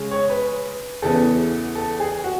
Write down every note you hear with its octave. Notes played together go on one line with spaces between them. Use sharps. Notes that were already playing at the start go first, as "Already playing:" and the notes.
Already playing: C#3 G#3 C#4
C#5
B4
E2 C#3 E3 B3 A4
A4
G#4
F#4